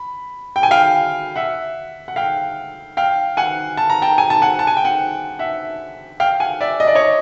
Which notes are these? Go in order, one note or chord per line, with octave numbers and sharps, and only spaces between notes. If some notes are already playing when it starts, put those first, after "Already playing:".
Already playing: B5
G5
G#5
F5 G5
E5 F#5
F#5
F5 G5
F5 G5
F#5 G#5
A5
A#5
G5 A5
G#5
A5
F#5 G#5
A5
G#5
G5
F#5 G#5
E5 F#5
F5 G5
F#5 G#5
D5 E5
D#5
D5
C#5 D#5